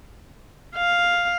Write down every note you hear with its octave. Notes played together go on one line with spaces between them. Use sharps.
F5